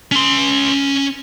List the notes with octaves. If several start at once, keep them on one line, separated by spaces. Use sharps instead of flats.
C#4 C6